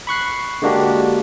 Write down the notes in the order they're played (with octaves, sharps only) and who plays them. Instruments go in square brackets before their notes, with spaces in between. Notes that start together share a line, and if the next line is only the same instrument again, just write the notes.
[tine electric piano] B5 C#6 F#6 C7
D3 G#3 A#3 D4 F#4 G4